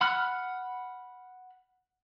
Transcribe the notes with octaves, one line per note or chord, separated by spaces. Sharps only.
F#5 B5 F6 F#6